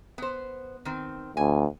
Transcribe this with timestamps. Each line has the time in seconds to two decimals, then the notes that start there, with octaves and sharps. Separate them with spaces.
0.18 B3 C5
0.85 D#3 C4
1.37 D2 G#5